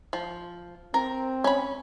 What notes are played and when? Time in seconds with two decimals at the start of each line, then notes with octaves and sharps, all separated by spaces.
0.13 F3
0.94 C4 A#4
1.44 C#4 B5